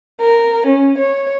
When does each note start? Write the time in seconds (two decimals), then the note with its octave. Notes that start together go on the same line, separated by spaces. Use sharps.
0.21 A#4
0.66 C#4
0.97 C#5